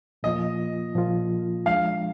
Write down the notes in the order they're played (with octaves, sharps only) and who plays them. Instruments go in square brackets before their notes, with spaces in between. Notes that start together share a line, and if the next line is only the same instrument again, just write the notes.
[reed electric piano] A#2 F3 A#3 F4 [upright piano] D#5
[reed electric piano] A#2 F3 A#3 F4
[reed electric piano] F3 G#3 D4 [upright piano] F5